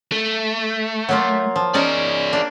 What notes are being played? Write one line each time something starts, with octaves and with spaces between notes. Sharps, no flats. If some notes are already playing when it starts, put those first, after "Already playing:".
A3
F#3 A#3 F4
F3
C#4 D#4 G#4 A#4 D5
A#3 D4